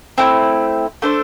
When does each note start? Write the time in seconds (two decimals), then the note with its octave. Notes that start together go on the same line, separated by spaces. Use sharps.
0.18 A3 C4 E4
1.02 A3 D4 A4 C5